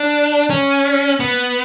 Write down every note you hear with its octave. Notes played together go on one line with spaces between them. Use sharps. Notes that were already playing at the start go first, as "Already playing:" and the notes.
Already playing: D4
C#4
B3